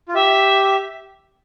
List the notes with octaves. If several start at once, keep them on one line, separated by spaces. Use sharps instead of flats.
F4
G4 E5